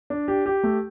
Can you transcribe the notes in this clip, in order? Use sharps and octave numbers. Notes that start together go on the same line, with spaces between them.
D4
G4
G4
A3